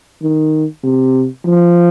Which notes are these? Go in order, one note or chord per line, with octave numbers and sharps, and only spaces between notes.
D#3
C3
F3